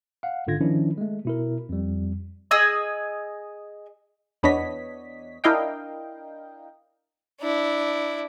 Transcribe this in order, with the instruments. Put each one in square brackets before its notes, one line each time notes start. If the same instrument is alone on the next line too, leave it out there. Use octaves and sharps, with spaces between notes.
[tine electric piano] F5 F#5
G#1 G#2 D3 F4 G#6 A#6
D#3 F3 C#4 D4 E4
G#3 A3
B2 E4 A#4
F2 G3
[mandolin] G#4 D#5 G#5 E6
[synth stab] E2 B3 D4 C#5 D#5 B6
D4 E4 A#4 D#5 F5 G5
[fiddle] D4 E4